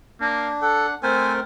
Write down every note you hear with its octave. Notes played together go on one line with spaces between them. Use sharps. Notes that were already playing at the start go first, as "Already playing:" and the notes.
A#3 D4
A4 F#5
A3 C4 A#4 C5 G#5